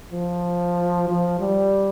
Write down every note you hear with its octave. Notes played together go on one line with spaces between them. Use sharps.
F3
F3
G3